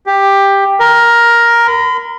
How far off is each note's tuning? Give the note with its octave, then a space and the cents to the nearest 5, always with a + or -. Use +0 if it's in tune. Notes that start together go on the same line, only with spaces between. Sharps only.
G4 +10
A#4 +10
B5 +45